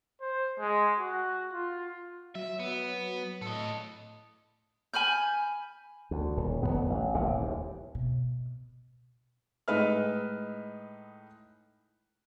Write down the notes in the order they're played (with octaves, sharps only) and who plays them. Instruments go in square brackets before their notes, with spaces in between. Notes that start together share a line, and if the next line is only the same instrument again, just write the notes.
[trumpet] C5
G#3
F#4
F4
[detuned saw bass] F#3 [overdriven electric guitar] E5
[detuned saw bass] F#3 [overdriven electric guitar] B3
[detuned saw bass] A2 [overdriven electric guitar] A4 D#5
[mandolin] G#5 B5 F6 G6
[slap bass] D2
D#1
D1 E2 B3
A1
D#1 A1 C3
D#2
[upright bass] B2
[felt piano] A2 G#3 D#4 B4 E5 F6